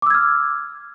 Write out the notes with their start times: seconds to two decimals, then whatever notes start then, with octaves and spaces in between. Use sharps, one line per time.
0.02 D6
0.06 E6
0.10 G#6
0.14 F6